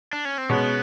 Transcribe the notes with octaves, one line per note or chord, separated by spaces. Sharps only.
D4
C#4
C4
B2 G#3 B3 C#4